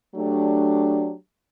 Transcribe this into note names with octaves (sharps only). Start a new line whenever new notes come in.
F#3 A3 D4 G4